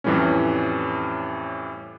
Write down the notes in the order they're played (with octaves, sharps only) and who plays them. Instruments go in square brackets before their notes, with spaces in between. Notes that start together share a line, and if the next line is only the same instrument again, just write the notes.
[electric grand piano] F2 A2 E3 G3 A3 C#4